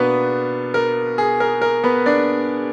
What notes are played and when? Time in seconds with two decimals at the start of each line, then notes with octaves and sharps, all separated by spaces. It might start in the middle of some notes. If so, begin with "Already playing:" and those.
Already playing: B2 A#3 B3 D4 B4
0.74 A#4
1.18 G#4
1.40 A#4
1.62 A#4
1.84 B3 B4
2.06 D4 D5